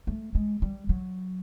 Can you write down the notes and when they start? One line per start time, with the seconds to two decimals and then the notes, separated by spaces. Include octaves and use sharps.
0.07 A3
0.35 G#3
0.62 G3
0.89 F#3